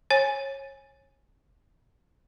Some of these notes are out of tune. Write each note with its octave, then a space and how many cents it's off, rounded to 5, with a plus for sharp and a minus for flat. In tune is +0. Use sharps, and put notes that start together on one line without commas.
C#5 -25 G#5 +0